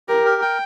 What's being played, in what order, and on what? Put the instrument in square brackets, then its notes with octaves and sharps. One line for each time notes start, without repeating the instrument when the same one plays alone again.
[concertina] G4 [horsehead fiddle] A#4
[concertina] A#4
G5